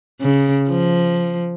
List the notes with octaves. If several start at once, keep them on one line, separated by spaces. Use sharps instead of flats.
C#3
F3